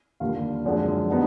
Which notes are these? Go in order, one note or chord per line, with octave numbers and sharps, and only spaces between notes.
D#2 D3 G3 A#3 F4 F5
F#2 D3 F3 G#3
D3 G3 B3 D#4